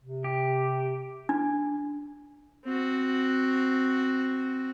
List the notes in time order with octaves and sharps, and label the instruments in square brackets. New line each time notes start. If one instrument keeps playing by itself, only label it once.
[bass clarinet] C3
[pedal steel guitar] G4
[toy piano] D4
[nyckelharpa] C4 F#4